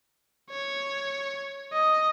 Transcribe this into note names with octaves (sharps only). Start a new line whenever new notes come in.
C#5
D#5